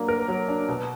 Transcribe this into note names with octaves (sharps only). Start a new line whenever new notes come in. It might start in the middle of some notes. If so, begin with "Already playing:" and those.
Already playing: F#3 A#3 D4
A#4
F#3
D4
B2